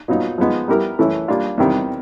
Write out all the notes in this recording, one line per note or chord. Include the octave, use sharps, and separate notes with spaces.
A#2 F#3 B3 D#4
F3 G#3 B3 D#4
G3 B3 E4 G4 A#4
E3 A3 C#4 E4
G3 A#3 D4 F4
E2 C3 D#3 G3